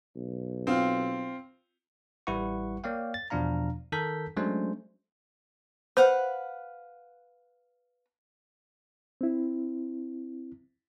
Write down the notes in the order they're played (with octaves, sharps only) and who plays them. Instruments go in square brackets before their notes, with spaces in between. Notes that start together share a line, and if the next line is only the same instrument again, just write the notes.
[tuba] B1
[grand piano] C4 F4
[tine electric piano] A1 G3 E4 B4 F#5 C#6
A#3 C#5 D5 F5 G5
A6
E2 B2 F3 D4 F5 A#5
D#3 A4 A#4 A5 G6 B6
F#3 G#3 A3 C#4 D4 C5
[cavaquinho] B4 F5 F#5 [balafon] C5
[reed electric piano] C4 E4